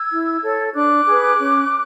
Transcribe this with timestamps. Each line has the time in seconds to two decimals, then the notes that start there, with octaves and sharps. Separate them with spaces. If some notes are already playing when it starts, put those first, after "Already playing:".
Already playing: E6 G#6
0.12 E4
0.44 A4 C#5
0.75 D4 D6 F#6
1.07 G#4 B4
1.39 C#4